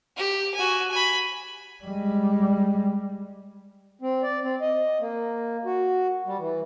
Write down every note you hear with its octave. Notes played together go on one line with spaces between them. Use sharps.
G4
F#4 G#5
G#5 B5
G3 G#3
C4
D5
C4
D#5
A#3
F#4
G3
E3